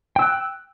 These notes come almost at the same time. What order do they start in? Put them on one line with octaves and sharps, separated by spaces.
G5 E6 F#6